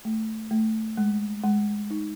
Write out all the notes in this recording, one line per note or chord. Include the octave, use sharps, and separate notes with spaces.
A3
A3
G#3
G#3
D#4